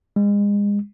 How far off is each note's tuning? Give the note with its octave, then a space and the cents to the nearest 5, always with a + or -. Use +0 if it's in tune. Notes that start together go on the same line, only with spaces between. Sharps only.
G#3 -30